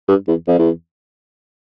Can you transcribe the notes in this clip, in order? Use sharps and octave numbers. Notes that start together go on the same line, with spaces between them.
G2
E2
F2
E2